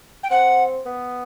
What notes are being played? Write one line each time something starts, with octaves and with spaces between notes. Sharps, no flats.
G5
C4 F#5
B3